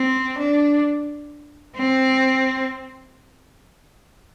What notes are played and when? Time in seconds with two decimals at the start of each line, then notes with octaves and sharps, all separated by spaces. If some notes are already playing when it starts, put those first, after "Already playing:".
Already playing: C4
0.38 D4
1.77 C4